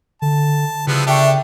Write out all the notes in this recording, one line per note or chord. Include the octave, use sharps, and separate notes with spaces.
D3 A5
C#3 F3 G3 B3 E4 E6 F#6
D4 G4 A4 E5 G5 C#6